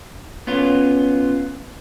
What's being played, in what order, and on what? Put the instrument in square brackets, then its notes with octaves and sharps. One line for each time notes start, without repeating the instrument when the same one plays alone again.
[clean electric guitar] B3 C#4 F4